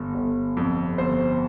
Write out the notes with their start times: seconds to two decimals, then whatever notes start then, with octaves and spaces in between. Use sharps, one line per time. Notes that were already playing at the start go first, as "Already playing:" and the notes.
Already playing: G1
0.14 G1
0.57 F2
0.98 G1 C5